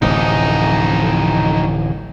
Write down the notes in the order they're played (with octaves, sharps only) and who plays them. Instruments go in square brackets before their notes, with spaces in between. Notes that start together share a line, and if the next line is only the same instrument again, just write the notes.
[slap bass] D1 A1 C3 [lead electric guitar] F2 D#4